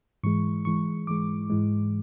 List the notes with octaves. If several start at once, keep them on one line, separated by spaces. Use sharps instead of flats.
G#2 E3 G#3 C#6
G#2 E3 G#3 C#6
G#2 E3 G#3 D6
G#2 E3 G#3